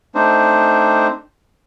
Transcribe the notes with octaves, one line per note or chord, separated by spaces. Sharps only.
A3 C4 D4 D#4 C5